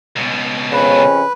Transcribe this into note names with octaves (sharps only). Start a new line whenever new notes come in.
C#2 B2
F2 C#3 C#4 B4